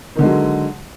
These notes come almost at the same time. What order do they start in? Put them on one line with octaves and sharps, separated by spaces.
D#3 D3 G#3 F#3